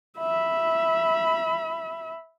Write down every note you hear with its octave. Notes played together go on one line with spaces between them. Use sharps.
E5 B5